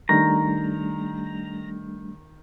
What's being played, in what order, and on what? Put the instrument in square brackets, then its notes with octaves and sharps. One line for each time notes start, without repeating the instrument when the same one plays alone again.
[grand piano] D#3 [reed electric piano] G3 A3 D4 [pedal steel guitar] A#5